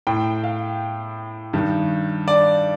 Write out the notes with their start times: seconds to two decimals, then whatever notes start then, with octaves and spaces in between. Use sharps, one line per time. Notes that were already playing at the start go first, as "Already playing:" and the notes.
0.07 A2 G5
0.44 F5
1.53 G2 D#3
2.28 D5